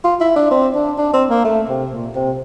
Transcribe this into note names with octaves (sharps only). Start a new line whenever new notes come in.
F4
E4
D4
C4
D4
D4
C4
A#3
A3
C3
A#2
C3